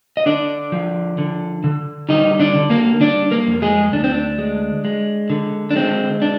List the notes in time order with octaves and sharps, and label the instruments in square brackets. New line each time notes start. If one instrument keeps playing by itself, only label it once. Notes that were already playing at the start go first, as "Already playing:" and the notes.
[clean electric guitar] D#5
D3 D4 D5
F3
D3
D3
G3 D#4 D#5
D4 D5
D3
A#3 A#4
G3 D4 D5
A#3 A#4
F2
G#3 G#4
D2 D4
C4
D4
G#3
G#3
D3
D4
G#3 C4
D4